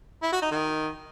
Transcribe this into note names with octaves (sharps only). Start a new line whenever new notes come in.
E4
F#4
D#4
D#3